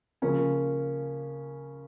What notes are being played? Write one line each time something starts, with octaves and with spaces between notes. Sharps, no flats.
C#3 F3 A#3 C#4 F4